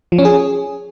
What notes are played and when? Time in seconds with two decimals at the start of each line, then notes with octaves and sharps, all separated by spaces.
0.12 F3
0.19 C#4
0.25 G#4